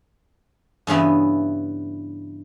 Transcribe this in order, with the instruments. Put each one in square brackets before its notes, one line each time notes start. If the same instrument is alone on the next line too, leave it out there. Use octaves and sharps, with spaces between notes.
[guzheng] G2 C#3 E3 B3